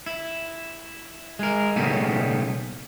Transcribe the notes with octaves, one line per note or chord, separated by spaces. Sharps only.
E4
G#3 A#4
B1 A2 C#3 G3 A#3 B3